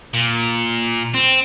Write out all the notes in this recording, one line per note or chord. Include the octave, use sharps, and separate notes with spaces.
A#2
C4